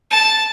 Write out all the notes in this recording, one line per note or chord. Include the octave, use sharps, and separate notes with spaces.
A5